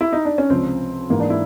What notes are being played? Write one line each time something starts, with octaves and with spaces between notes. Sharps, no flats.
E4
D#4
D4
C#4
C#2 C3 F3 C4
G#2 E3 A#3
D4
E4